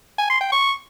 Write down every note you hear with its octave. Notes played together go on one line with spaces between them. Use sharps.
G#5
C6
G5
C#6